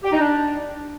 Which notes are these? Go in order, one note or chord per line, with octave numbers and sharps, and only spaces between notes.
G4
D#4
D4